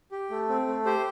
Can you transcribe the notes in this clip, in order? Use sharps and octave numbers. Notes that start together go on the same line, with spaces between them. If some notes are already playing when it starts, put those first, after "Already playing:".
G4
A3
C4
A3
G4 C5